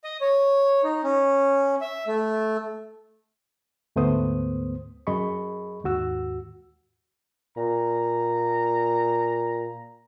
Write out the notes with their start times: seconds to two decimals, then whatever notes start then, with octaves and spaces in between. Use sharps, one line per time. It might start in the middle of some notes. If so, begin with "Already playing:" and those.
0.04 D#5
0.21 C#5
0.84 D#4
1.03 C#4
1.81 E5
2.07 A3
3.96 D2 G#2 A3 B3 C5 D#6
5.07 F#2 G#4 D#5 B5 C#6
5.84 D#2 G#2 F#4 E6
7.57 A#2 A#5